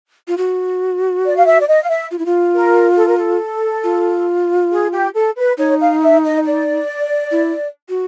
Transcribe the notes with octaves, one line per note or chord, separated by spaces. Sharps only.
F4
F#4
D5
F5
E5
D5
D#5
F5
E5
F4
E4
F4
A#4
A4
A#4
A4
F4
G#4
G4
A4
B4
D#4 C#5
F5
E5
D#5
D5
E4
F#4